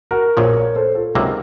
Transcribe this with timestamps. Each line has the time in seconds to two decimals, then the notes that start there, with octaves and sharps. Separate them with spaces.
0.11 F#4 A#4
0.37 A#1 A#2 F3 A#4 C#5
0.56 A#4 C#5
0.76 A4 C5
0.95 F4 A4
1.15 C#2 C3 F#3 A#3 D#4 F#4